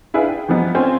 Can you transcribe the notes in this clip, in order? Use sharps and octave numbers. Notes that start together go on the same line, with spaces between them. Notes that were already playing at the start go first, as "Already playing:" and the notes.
D4 E4 G#4 B4 F5
G5
E3 F3 G3 B3 D#4
C4 C#4 F4 C5 G#5